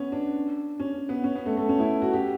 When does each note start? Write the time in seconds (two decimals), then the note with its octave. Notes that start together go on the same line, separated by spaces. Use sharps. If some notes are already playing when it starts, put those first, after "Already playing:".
Already playing: B3 C#4
0.12 D4
0.80 C#4
1.09 B3
1.24 C#4
1.35 B3
1.46 A3
1.57 A3
1.69 C#4
1.80 E4
2.02 F#4
2.13 G4